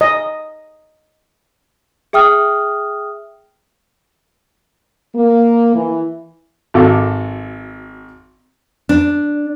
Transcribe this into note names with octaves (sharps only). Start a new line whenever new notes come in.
D#5
G#4 E5 G5 D#6 F6
A#3
E3
G#1 F#4 A4 F5 D6
D4